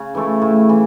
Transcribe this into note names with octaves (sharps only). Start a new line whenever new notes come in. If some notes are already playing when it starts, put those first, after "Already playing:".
Already playing: C#3
E3 A3 E4
A2
E3